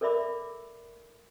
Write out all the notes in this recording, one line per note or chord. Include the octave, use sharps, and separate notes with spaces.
A4 A#4 D5 E5 B5 D6